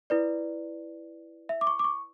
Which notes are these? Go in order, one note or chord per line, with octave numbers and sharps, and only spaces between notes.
E4 B4 D5
E5
D6
C#6
D6
C#6